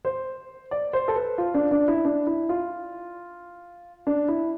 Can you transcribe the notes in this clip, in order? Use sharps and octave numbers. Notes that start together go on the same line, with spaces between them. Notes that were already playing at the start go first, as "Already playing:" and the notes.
C5
D5
C5
A4
B4
F4
D4
D4
E4
D4
E4
F4
D4
E4